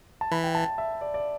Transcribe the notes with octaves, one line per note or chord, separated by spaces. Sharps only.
A5
E3 B5
G5
A5
E5
D5
D5